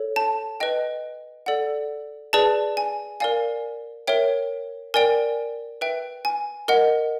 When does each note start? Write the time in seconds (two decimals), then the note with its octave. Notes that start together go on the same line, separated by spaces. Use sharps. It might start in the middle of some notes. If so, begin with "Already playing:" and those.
Already playing: A4 C#5
0.16 A5
0.60 B4 D#5 G5
1.46 A4 D5 F#5
2.33 G#4 B4 D5 A5
2.77 G#5
3.20 A#4 D5 F5 G#5
4.07 A#4 C#5 E5 G5
4.94 A#4 D5 G5 G#5
5.81 B4 E5 G5
6.25 G#5
6.68 A#4 D#5 F#5